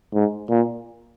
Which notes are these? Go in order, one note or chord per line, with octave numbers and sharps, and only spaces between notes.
G#2
A#2